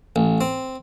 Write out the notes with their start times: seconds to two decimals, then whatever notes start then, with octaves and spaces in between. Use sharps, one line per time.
0.16 A1
0.41 C4